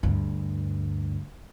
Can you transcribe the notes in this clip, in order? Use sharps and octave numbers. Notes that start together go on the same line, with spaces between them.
D2 G2